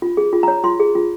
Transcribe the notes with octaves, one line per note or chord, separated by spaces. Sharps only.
F4
G#4
F4
C#5 A#5
F4 C6
G#4
F4